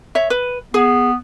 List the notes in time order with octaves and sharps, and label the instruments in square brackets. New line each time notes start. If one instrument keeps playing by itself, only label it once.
[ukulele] C#5 E5
B4
[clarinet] B3 [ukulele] G#4